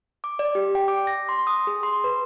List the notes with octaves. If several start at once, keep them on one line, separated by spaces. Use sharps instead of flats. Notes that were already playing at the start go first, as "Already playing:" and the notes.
D6
D5
G4
G5
D6
A#6
C6
D#6
G#4
C6
B4